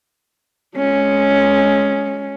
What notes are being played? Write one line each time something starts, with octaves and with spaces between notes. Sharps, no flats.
G#3 C#4